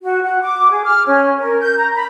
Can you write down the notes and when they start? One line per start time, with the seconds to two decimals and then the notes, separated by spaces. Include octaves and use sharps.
0.03 F#4
0.22 F#5
0.42 D6
0.70 G#4
0.84 F6
1.07 C#4
1.39 A#4
1.61 G6
1.78 A#5
1.94 B5